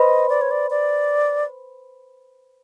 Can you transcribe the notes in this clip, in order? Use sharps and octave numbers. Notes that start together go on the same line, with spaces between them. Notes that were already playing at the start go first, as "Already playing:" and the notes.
Already playing: B4 C5 D#5 B5 C6
D5
C#5
D5
D5